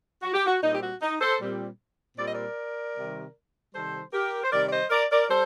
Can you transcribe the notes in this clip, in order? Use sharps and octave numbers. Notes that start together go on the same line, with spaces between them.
F#4
G4
F#4
A#2 G3 C4 D#4
G4
F#4
D#4
A4 C5
A#2 G3 C4
A#2 G3 C4 D5
D#5
A#4 D5
C3 D#3 G3
C3 D#3 G3 A4 C5
G4 A#4
C5
C3 D#3 G3 A#4 D5
D5
C5 D#5
A#4 D5
A#4 D5
G3 A4 C5